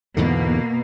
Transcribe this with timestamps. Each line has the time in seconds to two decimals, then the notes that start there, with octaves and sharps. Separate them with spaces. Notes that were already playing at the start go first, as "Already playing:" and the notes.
0.17 E2 G#2 B2 D3 A#3